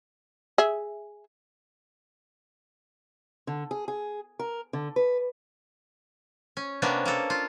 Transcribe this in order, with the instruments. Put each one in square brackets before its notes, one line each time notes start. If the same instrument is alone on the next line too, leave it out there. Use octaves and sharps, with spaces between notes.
[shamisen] G#4 E5
[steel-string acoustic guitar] D3
G#4
G#4
A#4
D3
B4
[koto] C#4
C3 A#3 B3 C#4 D4
A#3 A4
F4